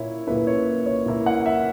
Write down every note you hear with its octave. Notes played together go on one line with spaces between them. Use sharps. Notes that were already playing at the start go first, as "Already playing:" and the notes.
Already playing: A#2 A#3 E4 C#5
A#2 A#3 E4 B4
C#5
C#5
A#2 A#3 E4
F#5
E5